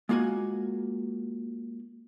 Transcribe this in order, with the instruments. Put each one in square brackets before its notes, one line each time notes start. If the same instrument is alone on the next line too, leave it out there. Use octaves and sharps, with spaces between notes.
[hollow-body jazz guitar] G#3 A#3 F4 F#4 G#5